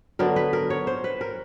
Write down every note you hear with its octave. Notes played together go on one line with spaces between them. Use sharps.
D3 F#3 B3 A#4
B4
A#4
C#5
C5
B4
A#4